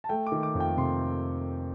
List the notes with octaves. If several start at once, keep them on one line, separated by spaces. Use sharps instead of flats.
A5
A3 G5
D6
D#3
D6
F2
G5
C3 C6